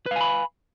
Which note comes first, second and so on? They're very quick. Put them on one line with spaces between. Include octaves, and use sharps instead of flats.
B4 F5 G#5 B5